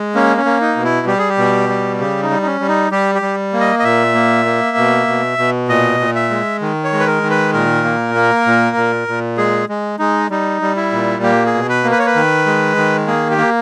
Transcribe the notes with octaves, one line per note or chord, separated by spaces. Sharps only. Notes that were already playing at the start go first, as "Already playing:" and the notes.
Already playing: G#3
A#3 C#4
C#4
A#3
D#4
B2
E4
G3 G4
G#4
G4
B2
G3
C#3 G4
D#4
G3
D#4
C#4
G3
D#4
G3 G4
G4
G3
A#3
D#5
D#5
A#2 E5
A#3
A#3
B2
B2
B2
A#2 D#5
A#2
E5
G#3
D#3
C#5
G#3
B4
A#4
D#3
B4
A#2 A#4
A#3
A#3
A#2
A#2
A#2
G#3 G#4
G#3
G#3 D#4
G3 D#4
G3
E4
A#2
A#3 G4
G#4
B2
B4
A#3
B4
C#5
B4
D#3
G#3
D#3
A#3 G#4
G4
A#3